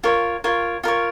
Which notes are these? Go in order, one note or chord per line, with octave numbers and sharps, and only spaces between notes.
F4 A#4 C#5
F4 A#4 C#5
F4 A#4 C#5